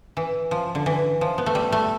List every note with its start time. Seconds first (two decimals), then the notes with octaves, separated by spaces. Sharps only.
0.17 E3
0.51 F3
0.75 D3
0.86 E3
1.21 F3
1.38 B3
1.46 A3
1.55 G3
1.72 A3